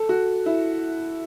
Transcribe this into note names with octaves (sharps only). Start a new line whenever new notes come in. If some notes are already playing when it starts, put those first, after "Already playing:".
Already playing: A4
F#4
E4